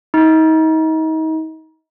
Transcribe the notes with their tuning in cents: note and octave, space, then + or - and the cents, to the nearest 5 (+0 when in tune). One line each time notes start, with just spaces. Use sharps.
D#4 +35